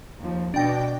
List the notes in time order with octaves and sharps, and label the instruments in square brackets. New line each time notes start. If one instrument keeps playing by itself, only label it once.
[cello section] D#2 F3
[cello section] B2 D5 [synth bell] D4 G5 A#6